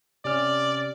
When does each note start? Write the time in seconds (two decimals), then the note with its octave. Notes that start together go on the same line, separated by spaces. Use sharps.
0.25 C3 C#4 D5 F6